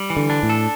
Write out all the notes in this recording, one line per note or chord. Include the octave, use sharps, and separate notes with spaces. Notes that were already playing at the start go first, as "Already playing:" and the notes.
Already playing: G3
E3
D3
D4
A2
A4